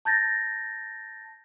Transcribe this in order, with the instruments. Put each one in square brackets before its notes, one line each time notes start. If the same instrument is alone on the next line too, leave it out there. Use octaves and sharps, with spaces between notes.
[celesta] A5 G6 A6 A#6